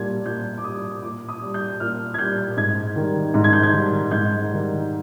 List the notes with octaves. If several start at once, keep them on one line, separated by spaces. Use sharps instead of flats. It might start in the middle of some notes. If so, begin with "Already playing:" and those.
Already playing: A#2 G3 G#6
A#2 G6
D6
G3 D#6
A#2 D6
D#6
G3
G6
A#2 F6
G#6
G3 G6
G#2 G#6
D#3 G3
G#2
G#6
G6
G#6
D#3 G3
G#2 G6
D#3 G3